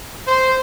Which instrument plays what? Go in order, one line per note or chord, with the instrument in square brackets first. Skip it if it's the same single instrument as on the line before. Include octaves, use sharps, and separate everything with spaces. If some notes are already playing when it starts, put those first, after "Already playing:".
[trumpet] C5